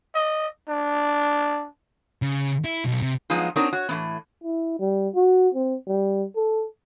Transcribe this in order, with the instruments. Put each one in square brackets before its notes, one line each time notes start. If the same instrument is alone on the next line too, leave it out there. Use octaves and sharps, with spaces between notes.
[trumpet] D#5
D4
[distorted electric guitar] C#3
E4
B1
C3
[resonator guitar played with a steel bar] F3 F#3 G#3 B3 D#4 F4
C4 D4 D#4 F#4 A#4 C#5
F#4 C#5
A2 E3 B3
[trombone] E4
G3
F#4
C4
G3
A4